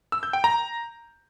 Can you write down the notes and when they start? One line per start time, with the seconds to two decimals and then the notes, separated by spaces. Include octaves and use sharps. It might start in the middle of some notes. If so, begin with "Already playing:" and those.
0.12 E6
0.23 G6
0.33 G5
0.44 A#5